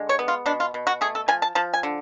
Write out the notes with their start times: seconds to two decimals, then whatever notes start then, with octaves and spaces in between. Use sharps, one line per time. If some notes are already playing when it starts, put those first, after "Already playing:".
Already playing: D3 G#3
0.09 C#5
0.19 B3
0.28 F4
0.46 B2 D4
0.60 F4
0.74 B2
0.87 F#4
1.01 A3 G#4
1.15 A4
1.28 F3 G#5
1.42 A5
1.55 F3 A5
1.74 G#5
1.83 D3